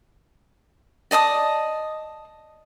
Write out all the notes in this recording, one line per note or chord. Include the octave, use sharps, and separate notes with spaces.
D5 D#5 A5 D#6